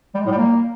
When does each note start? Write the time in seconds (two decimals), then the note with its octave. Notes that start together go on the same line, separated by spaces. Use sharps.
0.15 G3
0.20 G#3
0.26 A2
0.32 G3
0.37 A#3